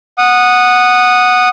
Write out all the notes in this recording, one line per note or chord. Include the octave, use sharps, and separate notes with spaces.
F#5 D#6